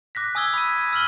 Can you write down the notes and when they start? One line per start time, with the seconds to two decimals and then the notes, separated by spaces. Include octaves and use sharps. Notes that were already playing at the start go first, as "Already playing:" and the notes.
0.15 D6 F#6 A#6 B6
0.35 G#5 D#6 E6 G#6 G7
0.54 B5 B6 D#7
0.69 G#6
0.93 E6 F6 D#7 F#7 G7